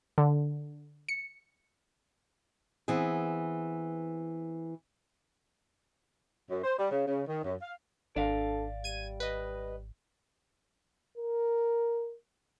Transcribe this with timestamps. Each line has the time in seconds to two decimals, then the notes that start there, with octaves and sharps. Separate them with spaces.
0.18 D3
1.09 C#7
2.88 E3 B3 C4 G#4
6.50 F#2
6.63 C5
6.78 G3
6.91 C#3
7.06 C#3
7.27 D#3
7.44 F#2
7.61 F5
8.16 G#1 D4 A4 D5 F5
8.84 G3 G#6 D#7
9.20 B4 D#5
11.18 A#4